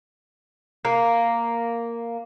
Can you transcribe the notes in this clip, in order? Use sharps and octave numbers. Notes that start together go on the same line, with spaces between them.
A#3